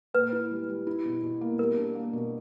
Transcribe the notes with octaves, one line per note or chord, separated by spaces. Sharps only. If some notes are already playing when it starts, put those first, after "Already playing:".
A#2 B4
E4
G3
G3
E4
B2
B2
A#3
G3 A#4
D4
A#3
B2